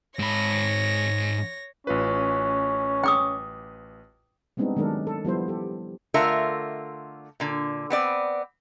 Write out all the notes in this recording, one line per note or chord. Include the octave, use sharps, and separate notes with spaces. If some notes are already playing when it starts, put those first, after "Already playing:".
G#2 C#5 B5 A#6
A1 C#4 F4 B4
G5 D6 D#6
G3 G#3 B3 C4 D4 D#4
D#3 F#3 G#3 D4 A4 A#4
A4
F3 G3 B3 E4 A4 C5
G4 A4
D3 A3 F4 A#4 E5
A#2 D3
B3 C4 D5